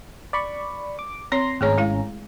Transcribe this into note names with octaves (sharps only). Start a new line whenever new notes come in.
D5 B5 C#6
D6
C4 C#5 A#5 C6 A#6
G#1 A3 C#4 G#4 C#5 A#5
G#3 E4 F5